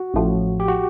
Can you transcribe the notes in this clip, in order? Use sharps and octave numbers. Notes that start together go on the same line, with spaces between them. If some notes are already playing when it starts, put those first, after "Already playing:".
Already playing: F#4
A1 A2 F3
G4
F#4